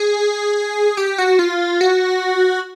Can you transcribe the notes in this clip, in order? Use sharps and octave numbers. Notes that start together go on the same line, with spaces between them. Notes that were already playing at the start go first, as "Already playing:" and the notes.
Already playing: G#4
G4
F#4
F4
F#4